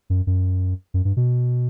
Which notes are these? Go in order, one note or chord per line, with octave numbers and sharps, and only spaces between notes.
F#2
F#2
F#2
G2
B2